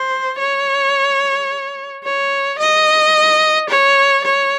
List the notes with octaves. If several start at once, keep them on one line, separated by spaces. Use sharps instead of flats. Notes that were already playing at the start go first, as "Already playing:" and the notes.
Already playing: C5
C#5
C#5
D#5
C#5
C#5